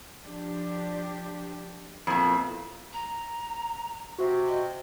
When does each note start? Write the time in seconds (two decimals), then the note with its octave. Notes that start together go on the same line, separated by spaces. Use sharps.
0.22 F3 D4 G4
2.07 F2 A#2 B3 E4
2.93 A#5
4.18 C3 F#4
4.48 D#5